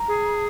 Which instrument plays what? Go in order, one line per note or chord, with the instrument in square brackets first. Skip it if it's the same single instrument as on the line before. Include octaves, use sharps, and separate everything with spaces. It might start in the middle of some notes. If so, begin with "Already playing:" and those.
Already playing: [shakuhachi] A#5
[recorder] G#4